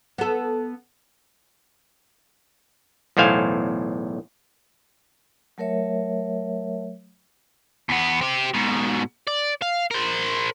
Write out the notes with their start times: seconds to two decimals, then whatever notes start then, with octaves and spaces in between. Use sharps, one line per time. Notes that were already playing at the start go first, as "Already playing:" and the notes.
0.18 B3 A4
3.17 B1 E2 A2 C5 F5 G#5
5.58 F#3 A3 A#4 C#5 E5
7.89 E2 B3
8.21 C4 G4
8.54 G#2 B2
9.28 D5
9.62 F5
9.91 A#4 C5